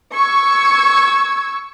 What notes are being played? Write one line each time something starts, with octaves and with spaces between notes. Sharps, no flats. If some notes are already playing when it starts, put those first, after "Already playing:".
C#6 E6 G#6